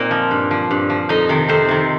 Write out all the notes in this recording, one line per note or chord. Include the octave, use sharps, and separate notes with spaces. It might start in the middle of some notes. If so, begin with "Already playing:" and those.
Already playing: A#2 A#3 C4 D#4 A#4 C5
F3
G2
F3
G2
F3
F2 D#4 D#5
C3 D#3
F2 C4 C5
C3 D#3